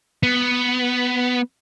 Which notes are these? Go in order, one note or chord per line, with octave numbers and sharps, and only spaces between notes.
B3